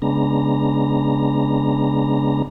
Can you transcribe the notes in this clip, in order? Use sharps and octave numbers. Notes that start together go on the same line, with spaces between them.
C#3 G#3 B3 D4 A#5